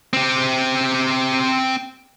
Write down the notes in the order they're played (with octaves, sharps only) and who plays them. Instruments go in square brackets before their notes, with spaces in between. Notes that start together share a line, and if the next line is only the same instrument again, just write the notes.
[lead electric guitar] C4 G4